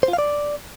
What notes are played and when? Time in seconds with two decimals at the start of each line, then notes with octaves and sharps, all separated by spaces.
0.03 C5
0.08 F4
0.13 F5
0.18 D5